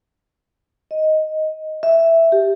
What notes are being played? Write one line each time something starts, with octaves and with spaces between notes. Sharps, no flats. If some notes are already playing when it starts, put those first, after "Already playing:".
D#5
E5
G4